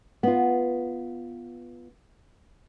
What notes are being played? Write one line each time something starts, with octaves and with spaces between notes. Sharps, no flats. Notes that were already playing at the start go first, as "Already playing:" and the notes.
B3 F4